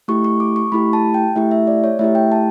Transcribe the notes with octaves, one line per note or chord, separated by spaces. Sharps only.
A3 E4 G4 C#6
C#6
D6
C#6
A3 E4 G4 B5
A5
G5
A3 E4 G4 E5
E5
D5
C#5
A3 E4 G4 E5
G5
A5